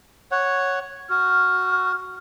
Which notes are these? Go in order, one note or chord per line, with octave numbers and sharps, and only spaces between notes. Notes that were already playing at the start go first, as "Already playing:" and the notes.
C#5 F#5
F#4 F6